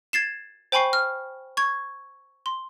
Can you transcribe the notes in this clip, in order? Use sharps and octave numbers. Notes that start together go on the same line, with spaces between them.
G#6 A6 C7 E7
C5 G5 G#5 B5 C#6 C7
F6
C#6 G#6
C6